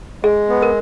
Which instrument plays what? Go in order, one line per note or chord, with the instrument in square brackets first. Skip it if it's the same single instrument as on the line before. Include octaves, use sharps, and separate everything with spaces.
[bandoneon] G#3 [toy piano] G#4
[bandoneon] B3
[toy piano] A#4